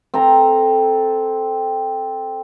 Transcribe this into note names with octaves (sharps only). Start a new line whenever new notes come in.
C4 A4 A#5